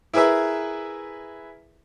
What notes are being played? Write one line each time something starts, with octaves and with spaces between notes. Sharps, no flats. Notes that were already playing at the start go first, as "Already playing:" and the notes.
E4 G#4 A#4 B4 E5